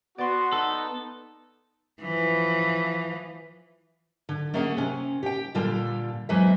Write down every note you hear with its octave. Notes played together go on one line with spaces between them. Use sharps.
B3 F#4 D5 C6
D#4 A4
E3 F3
D3
A3 A#3 C#4 G#4 F5 F#5
C3 C#4
G4 G5
A#2 D3 G3 F4 A4
E2 E3 F#3 G#3 C5 E5